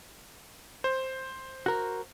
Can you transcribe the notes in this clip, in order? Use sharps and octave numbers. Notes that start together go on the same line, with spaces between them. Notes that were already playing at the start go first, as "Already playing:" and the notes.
C5
F#4 A#4